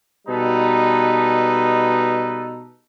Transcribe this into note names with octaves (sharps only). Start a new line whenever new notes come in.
B2 G3 D#4 A4 B4